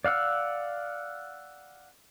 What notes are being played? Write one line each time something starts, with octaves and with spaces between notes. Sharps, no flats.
D5 F5 F#5 E6